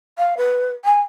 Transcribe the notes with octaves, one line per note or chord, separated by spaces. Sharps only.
F5
B4
G#5